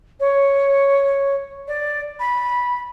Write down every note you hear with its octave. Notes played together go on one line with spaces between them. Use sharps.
C#5
D5
B5